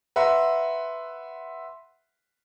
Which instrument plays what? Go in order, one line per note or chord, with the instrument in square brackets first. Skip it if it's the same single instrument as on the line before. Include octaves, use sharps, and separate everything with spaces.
[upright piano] B4 E5 F#5 A#5 C6